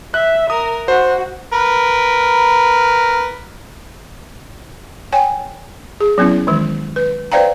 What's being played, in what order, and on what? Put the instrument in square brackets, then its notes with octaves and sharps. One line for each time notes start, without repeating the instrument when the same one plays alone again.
[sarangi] E5 [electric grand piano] F#6
[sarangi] A#4 [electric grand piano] D#6
[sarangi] F#4 [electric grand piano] C5
[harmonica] A#4 B4
[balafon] C#5 G5 G#5
G#4
F#3 B3 C#4 E4
D#3 E3 G#3
B4
B4 C5 D5 F5 G5 A#5